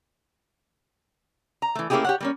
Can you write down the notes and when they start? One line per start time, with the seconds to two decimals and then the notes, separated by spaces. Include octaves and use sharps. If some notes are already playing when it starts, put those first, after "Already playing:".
1.62 A#5
1.75 E3 A3
1.90 A3 A#3 C#4 E4 G4 G#4
2.05 G4 C#5 F#5
2.20 G3 A#3 C#4